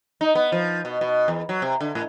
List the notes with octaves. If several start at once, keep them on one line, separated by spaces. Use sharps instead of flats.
D#4
B3
F3
B2
B2
E2
F#3
C3
D3
A2